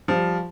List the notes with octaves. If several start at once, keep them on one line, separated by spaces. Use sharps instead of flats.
F3 G3